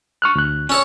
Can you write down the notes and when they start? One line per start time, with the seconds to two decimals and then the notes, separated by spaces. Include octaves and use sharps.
0.22 C#6 F6 F#6
0.35 D2 F#6
0.69 C#4 A4 C#5